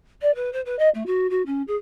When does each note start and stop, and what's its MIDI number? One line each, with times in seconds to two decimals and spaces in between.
0.22 0.34 74
0.35 0.52 71
0.53 0.61 72
0.66 0.78 71
0.79 0.89 75
0.94 1.03 57
1.06 1.27 66
1.30 1.42 66
1.46 1.62 61
1.67 1.75 68